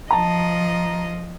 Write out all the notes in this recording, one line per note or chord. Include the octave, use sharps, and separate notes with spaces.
F3 D#5 A5 A#5